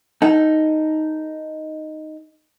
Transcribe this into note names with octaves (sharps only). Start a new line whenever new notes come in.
D#4 A4